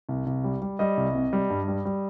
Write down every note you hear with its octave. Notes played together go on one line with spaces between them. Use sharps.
C2
C2
G3
G3
G3 D#5
C2
C3
G3
G2
G3
G3